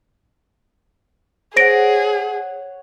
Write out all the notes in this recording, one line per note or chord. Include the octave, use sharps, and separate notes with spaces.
G#4 C5 C#5 F#5 A#6 D7